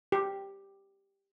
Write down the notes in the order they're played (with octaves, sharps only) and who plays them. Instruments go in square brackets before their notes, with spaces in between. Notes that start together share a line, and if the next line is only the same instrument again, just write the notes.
[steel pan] G4